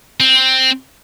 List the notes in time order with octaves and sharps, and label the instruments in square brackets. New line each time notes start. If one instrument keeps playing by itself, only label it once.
[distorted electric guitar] C4